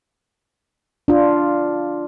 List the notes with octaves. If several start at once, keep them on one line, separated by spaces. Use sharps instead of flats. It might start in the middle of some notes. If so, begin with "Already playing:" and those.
D4 F4